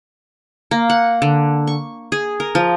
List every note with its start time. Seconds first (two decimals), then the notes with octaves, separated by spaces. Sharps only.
0.71 A#3
0.90 F#5
1.22 D3
1.67 C#6
2.12 G#4
2.40 A#4
2.55 F3